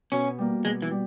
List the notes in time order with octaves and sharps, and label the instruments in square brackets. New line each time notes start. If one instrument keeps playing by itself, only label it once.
[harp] B2 [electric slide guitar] C#4
[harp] G3 A#3
[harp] B2 [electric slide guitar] G#3
[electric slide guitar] E3
[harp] G3